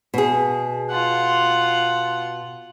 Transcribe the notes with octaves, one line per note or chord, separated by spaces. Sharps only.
B2 G#4
F4 F#5